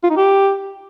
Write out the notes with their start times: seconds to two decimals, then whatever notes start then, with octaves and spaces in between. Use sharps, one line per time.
0.03 F4
0.10 D#4
0.17 G4